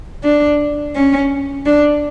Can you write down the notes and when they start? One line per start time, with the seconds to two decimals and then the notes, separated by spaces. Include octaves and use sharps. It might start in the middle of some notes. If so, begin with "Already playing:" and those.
0.23 D4
0.95 C#4
1.66 D4